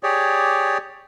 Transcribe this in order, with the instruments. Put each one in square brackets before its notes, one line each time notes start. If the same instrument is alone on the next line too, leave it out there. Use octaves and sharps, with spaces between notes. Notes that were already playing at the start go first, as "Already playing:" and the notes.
[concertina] G4 G#4 C#5 D5